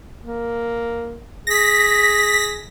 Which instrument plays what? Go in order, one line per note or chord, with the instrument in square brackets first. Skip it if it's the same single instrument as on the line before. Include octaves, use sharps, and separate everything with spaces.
[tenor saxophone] A#3
[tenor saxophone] G#4 [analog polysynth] A#6 B6